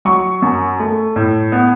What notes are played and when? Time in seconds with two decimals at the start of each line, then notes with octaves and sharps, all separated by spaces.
0.05 F#3 C#6
0.42 F#2
0.79 A3
1.16 A2
1.52 B3